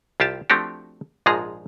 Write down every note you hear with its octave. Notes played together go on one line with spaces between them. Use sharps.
C2 F4 G4 A5
F3 A3 C4 D4 F#4 G4
A#1 G#2 F3 G#3 G#4 A#5